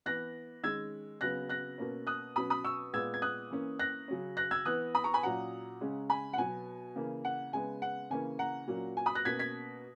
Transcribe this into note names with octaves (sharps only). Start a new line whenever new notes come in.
E3 B3 F#6 A#6
D#3 G#3 C#4 E6 G#6
C#3 F#3 B3 F#6 A#6
F#6 A#6
B2 A#3 C#4
D#6 F#6
B2 F#3 C#4 B5 D#6
B5 D#6
C#6 E6
A#2 G#3 B3 E6 G#6
G#6
D#6 F#6
E3 A#3 C#4
F#6 A#6
C#3 F#3 C#4
F#6 A#6
E6 G#6
E3 B3 D#6 F#6
B5 D#6
A#5 C#6
G#5 B5
A#2 F#3 C#4 F#5 A#5
C#3 G#3 C#4
G#5 B5
F#5
B2 F#3 B3 G#5
C#3 E3 A#3
F#5
C#3 G#3 B3 G#5
F#5
C#3 E3 A#3 C#4 G#5
F#5 A#5
A#2 F#3 A#3 C#4
G#5
B5 D#6
F#6 A#6
B2 A#3 C#4 G#6 B6
G#6 B6